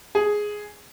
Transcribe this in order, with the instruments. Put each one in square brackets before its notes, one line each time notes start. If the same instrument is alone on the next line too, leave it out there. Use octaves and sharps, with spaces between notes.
[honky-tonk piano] G#4